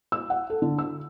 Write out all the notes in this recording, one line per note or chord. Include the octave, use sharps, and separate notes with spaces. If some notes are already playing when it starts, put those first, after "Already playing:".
E6
F#5
A4
D3
E6